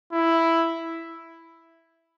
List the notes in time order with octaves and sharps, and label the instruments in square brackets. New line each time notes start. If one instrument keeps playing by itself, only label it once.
[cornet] E4